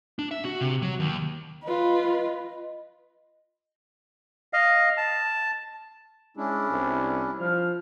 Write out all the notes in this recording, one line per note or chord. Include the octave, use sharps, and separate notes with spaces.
D4
E5
F#4
C3
F#3
D#2
F4 B4 D#5
D#5 F5
A5
G#3 C#4 D4 E4
C2
F3 C5 F6